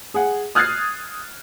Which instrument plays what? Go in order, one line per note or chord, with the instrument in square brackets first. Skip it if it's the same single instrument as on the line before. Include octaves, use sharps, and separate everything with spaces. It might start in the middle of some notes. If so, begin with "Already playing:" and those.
[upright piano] G#4 F#5
D#6 F6 F#6 G#6 A6 C7